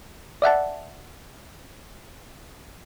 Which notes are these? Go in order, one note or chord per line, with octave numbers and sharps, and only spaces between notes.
D5 E5 F#5 A5